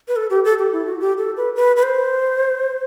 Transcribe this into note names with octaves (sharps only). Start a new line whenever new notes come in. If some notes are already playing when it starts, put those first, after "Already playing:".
B4
A4
G4
A4
G4
E4
F#4
G4
A4
B4
B4
B4
C5